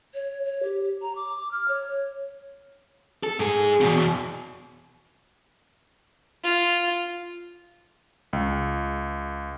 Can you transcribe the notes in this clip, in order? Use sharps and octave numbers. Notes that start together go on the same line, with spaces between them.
C#5
C#5
G4
A#5
D6
F6
C#5
A4
G#2 G#4
E2 B2
F4
C#2